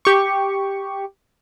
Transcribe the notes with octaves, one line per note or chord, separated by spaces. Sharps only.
G4 C#6